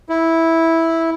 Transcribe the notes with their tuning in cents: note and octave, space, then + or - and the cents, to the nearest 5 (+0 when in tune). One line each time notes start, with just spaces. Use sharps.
E4 -10